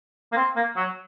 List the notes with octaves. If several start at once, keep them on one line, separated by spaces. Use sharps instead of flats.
A#3
C4
A#3
F#3